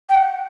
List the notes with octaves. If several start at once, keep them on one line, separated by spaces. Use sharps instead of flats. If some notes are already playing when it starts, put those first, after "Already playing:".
G5
F#5